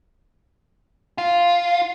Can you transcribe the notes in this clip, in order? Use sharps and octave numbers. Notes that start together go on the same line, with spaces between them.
F4